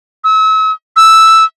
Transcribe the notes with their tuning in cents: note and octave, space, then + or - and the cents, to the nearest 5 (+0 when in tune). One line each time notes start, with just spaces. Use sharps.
E6 -40
E6 +0